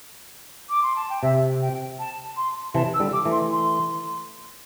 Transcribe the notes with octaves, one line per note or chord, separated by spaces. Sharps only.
D6
C6
A5
G5
C3 E5
G5
A5
C6
C3 E3 A5
E6
D3 G3
D6
E3 A3
C6
C6